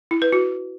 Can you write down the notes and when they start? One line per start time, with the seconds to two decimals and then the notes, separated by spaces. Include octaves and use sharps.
0.11 E4
0.22 B4
0.32 F#4